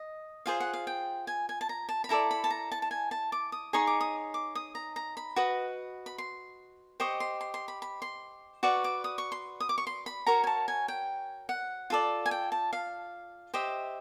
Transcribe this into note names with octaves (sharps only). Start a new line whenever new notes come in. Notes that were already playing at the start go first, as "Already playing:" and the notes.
Already playing: D#5
F4 G#4 C5 F5
F#5
F5
G5
G#5
G#5
A5
A#5
A5
B5
E4 A4 D5 A#5
B5
A5
A#5
A5
A5
G#5
A5
D6
D#6
D#4 G#4 C#5 C#6
D6
D#6
D6
D#6
A#5
A#5
B5
F#4 B4 D#5
B5
C6
G4 C5 D#5 C#6
C6
C6
C6
B5
B5
C6
F#4 B4 D5 C#6
D6
D#6
C#6
C6
D#6
D6
C#6
C6
B5
F#4 A#4 C#5 A#5
G#5
A5
G#5
G5
F#5
F4 A4 D5
G#5
G5
A5
F5
G4 C5 D#5 E5